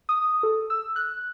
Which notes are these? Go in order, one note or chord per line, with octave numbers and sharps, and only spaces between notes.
D#6
A4
E6
F#6